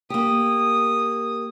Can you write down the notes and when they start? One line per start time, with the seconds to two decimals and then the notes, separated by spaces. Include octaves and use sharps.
0.10 A#3 G4 D#6